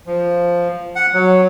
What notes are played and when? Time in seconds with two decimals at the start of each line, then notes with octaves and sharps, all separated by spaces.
0.07 F3
0.96 F#5
1.14 F#3